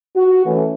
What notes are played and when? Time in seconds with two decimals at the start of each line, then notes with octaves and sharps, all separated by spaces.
0.16 F#4
0.45 E3 A3 C#4